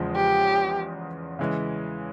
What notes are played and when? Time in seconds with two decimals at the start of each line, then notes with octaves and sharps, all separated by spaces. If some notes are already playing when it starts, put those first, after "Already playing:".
Already playing: E2 C#3 F3 G#3
0.16 G4
1.39 C#3 E3 G#3